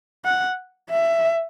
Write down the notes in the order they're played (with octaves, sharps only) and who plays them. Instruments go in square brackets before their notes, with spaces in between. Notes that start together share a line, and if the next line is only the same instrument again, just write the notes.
[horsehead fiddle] F#5
E5